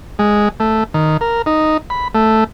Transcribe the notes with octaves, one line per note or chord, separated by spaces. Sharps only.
G#3
A3
D#3
A#4
D#4
B5
A3